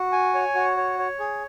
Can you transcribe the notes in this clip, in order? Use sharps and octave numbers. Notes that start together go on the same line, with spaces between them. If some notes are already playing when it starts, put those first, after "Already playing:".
Already playing: F#4
G#5
C#5
F#4
C#5
C#5
G#4